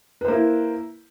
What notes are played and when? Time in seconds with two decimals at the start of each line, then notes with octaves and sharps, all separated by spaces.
0.21 B4
0.25 C5
0.28 A#3
0.32 E4